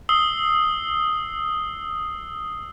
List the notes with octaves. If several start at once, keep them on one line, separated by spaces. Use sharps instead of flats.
D#6 E6 C7 G7